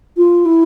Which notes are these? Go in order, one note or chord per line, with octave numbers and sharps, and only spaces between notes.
F4
E4